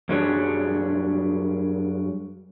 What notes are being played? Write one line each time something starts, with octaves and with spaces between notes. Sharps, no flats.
F#2 F#3 G3 D4 G#4 C#5